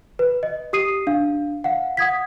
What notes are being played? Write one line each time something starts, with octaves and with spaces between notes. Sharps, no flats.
B4
D#5
G4 D#6 C7 D#7
D4 F5
F5 F#5
F#5 D#6 G#6 B6